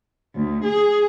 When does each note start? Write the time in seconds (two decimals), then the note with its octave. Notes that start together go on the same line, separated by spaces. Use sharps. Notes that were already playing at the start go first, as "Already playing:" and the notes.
0.35 D2
0.64 G#4